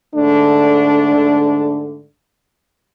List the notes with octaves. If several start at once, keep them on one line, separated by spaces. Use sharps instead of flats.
G#2 D3 A3 D4